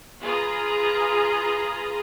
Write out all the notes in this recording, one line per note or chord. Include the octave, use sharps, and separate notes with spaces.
F4 G#4 B4 A#5 D#6